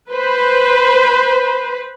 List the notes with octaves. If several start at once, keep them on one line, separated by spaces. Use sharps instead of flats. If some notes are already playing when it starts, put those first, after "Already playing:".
B4 C5 B5